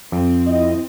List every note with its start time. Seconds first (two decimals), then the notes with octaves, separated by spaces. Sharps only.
0.12 F2 C4
0.48 E4 D#5